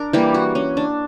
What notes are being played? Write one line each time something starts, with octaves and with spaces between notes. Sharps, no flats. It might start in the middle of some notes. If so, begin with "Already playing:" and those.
Already playing: D4 A#4
E3 G3 A#3 G4
F#4
C#4
D4